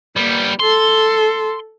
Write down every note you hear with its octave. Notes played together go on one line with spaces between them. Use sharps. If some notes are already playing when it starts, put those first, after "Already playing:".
G3 A#3 B3
A4 C6